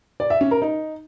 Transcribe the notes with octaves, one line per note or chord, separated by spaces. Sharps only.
D5
E5
C#4
A#4
D#4